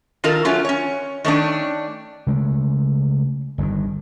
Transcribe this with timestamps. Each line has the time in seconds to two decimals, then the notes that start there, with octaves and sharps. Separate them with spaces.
0.24 D#3 F4 A4 A#4
0.45 F#3 A3 C#4 F4
0.65 C#4 C#5
1.24 D#3 A3 C#4 D4
2.27 C#3 G#3 A3
3.58 G1 G2 A#2 D#3